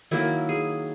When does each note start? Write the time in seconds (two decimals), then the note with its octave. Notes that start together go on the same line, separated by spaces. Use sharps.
0.11 D#3 F#3 A#3 E4
0.49 G#4